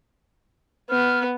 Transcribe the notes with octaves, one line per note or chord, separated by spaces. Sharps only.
B3 F6